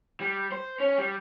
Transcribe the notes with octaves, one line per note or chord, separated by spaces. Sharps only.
G3
C5
C#4
G3